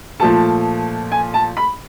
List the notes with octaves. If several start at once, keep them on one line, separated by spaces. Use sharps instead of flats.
A#2 F3 A3 A5
G#5
A5
B5